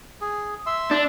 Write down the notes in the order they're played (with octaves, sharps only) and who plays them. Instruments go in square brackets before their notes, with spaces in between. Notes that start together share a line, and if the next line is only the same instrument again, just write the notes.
[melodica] G#4
E5 C6 E6
[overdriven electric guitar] D4